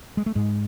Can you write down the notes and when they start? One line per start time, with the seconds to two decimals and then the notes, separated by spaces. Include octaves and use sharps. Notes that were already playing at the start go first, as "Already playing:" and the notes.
0.17 G#3
0.26 A3
0.35 G#2 G#3